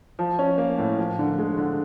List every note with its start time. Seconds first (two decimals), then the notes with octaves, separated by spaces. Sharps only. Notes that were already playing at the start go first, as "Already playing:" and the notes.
0.19 F3
0.39 C#4
0.58 A#3
0.78 A2
0.98 F3
1.19 D3
1.38 G#3
1.58 D3